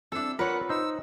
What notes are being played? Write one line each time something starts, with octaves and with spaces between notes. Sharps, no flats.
C4 D4 E4 A4 E6
F4 A#4 B4 C#5 D5 F#5
D#4 C5 E6